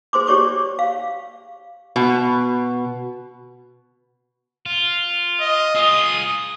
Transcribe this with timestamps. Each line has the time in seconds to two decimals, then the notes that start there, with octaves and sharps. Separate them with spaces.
0.13 G#4 C5 C6 D6
0.27 G4 C#5 D5 C#6 D6
0.79 F5
1.96 B2
4.66 F4
5.40 D#5
5.76 F4 G#4 D#6